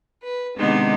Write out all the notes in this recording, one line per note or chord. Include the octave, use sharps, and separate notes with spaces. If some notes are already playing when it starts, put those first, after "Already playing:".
B4
C3 D#3 G#3 B3 D4 D#4